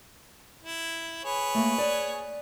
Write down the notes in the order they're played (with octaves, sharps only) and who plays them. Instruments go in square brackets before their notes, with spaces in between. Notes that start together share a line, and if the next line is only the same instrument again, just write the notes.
[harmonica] E4
G#4 B4 C#5
[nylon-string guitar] A3 A#3
D5 G#5